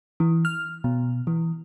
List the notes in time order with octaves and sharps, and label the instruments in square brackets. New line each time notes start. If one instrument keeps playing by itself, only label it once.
[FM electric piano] E3
F6
B2
E3